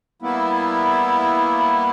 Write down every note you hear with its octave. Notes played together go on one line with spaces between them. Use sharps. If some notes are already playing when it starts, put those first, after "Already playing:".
G3 A#3 B3 E4